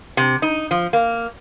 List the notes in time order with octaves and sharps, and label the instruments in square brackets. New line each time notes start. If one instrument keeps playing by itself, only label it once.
[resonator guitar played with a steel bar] C3
D#4
F3
A#3